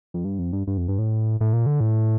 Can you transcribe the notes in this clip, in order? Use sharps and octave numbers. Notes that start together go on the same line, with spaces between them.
F2
G2
F2
G2
G2
F2
G2
A2
A2
A#2
D3
A2